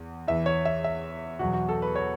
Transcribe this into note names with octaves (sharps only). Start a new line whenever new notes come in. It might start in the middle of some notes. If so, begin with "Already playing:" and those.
Already playing: E2
E2 E3 E5
C#5
E5
E5
E2 B2 F#3 F#4
F#4
A4
B4
C#5